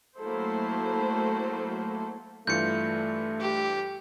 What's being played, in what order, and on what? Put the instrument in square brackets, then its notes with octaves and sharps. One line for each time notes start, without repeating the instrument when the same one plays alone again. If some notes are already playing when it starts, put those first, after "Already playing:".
[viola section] F#3 A3 A#3 E4 A4 C5
[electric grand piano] G2 E3 F4 [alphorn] A3 [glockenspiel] G6 C#7
[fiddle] G4